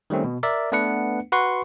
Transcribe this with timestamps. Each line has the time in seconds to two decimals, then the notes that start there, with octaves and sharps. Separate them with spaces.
0.10 D#3 G3 A3 C4 C#4
0.24 B2
0.43 A#4 D5 E5
0.72 A3 B3 D4 B4 F#5 C#7
1.32 F#4 B4 F#5 C6 C#6